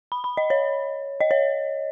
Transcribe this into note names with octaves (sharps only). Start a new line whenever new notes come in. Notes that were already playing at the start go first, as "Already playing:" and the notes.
B5
B5
D#5
C#5
D#5
C#5